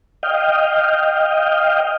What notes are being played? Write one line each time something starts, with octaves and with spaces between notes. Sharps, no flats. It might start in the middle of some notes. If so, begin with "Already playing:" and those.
D#5 F5 G5